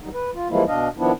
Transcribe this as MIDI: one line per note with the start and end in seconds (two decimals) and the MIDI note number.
0.01 0.10 51
0.01 0.10 54
0.01 0.10 55
0.01 0.10 63
0.14 0.31 71
0.35 0.48 65
0.50 0.64 52
0.50 0.64 53
0.50 0.64 55
0.50 0.64 56
0.50 0.64 58
0.50 0.64 64
0.68 0.88 47
0.68 0.88 62
0.68 0.88 75
0.68 0.88 77
0.98 1.12 51
0.98 1.12 53
0.98 1.12 59
0.98 1.12 62
0.98 1.12 64